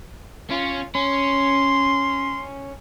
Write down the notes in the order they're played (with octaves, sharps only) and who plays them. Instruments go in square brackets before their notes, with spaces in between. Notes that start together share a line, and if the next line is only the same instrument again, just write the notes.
[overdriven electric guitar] C#4 [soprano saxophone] F4
[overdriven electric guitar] C#4 [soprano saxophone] C6